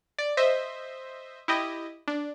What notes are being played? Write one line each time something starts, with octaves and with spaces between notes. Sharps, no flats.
D5
C5 D#5 E5
E4 G4 D#5
D4